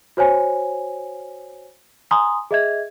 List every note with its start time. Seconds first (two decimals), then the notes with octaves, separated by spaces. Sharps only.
0.17 F#4 C5 C#5 G#5
2.11 G#5 A#5 C6 D#6
2.51 G#4 D#5 E5 G#6